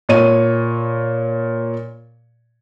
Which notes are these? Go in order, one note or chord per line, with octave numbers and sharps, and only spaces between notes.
A#2 C#5 D#7